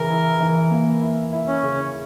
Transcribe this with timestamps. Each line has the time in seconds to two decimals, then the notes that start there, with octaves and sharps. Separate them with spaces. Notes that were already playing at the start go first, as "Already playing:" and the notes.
Already playing: C#3 E3 A#4
0.10 E4
0.40 E3
0.71 A#3
1.01 E4
1.32 E4
1.47 C#4
1.63 C#3